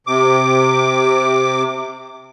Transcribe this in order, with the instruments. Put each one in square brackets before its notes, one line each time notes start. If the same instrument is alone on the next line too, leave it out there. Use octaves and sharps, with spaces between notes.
[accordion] C3 D6